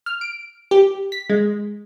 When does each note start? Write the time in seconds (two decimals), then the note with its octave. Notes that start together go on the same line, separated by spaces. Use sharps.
0.06 F6
0.21 D7
0.71 G4
1.12 B6
1.30 G#3